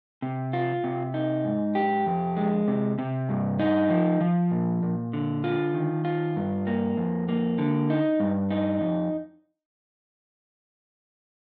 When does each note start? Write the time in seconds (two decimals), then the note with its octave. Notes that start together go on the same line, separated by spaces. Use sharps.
0.22 C3
0.53 F4
0.84 C3
1.14 D#4
1.45 G#2
1.75 G4
2.07 F2
2.36 G#3
2.68 C3
2.99 C3
3.29 G2
3.59 D#4
3.90 F3
4.21 F3
4.51 A#2
4.83 A#2
5.13 D3
5.44 F4
5.74 D#3
6.05 F4
6.36 G2
6.67 A#3
6.97 F2
7.29 A#3
7.58 D3
7.90 D#4
8.20 G2
8.50 D#4
8.81 F2